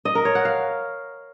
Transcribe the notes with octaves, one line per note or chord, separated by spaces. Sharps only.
D#5
A#4
C#5
F#5
F5